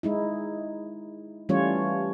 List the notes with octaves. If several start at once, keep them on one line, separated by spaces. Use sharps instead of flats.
G#3 D#4 E4
E3 G3 A3 C#4 F4 C#5